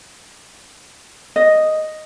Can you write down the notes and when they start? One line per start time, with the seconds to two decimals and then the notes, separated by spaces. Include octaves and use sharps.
1.36 D#5